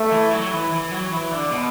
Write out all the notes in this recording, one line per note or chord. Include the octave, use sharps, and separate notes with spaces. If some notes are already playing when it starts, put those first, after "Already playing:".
Already playing: A3
E3
F#3
E3
E3
F#3
E3
D3
B2